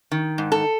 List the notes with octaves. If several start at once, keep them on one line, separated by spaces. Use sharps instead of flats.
D#3
G#2
A4